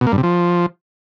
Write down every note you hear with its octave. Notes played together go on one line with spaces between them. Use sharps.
B2
A#3
G2
C3
F3